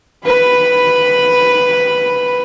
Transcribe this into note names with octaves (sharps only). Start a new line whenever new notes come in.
B4 B5